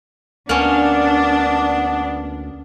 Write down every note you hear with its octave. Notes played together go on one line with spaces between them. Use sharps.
D2 A#3 B3 C#4 D4